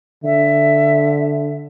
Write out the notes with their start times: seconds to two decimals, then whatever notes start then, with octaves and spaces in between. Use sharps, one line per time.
0.24 D3 E5